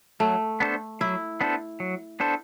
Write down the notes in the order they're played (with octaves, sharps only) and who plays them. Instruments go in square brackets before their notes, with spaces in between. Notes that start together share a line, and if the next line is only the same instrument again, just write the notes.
[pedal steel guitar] F#3 [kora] A3
[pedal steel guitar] B3 D4 A4 C5
[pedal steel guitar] F#3 [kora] E4
[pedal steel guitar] B3 D4 A4 C5
F#3
B3 D4 A4 C5